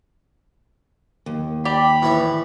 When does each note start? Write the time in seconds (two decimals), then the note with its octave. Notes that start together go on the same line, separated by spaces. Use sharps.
1.26 D#2
1.65 G4 D5 B5
2.02 A2 E3